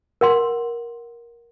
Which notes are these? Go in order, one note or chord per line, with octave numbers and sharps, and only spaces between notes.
A#4 F#5 C6